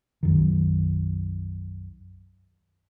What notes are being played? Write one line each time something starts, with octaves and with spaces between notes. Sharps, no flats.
B1 F#2 D#3